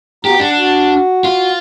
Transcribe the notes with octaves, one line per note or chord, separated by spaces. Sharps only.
B3 F#4 G4 A#5
D4 F#5
F#4
F4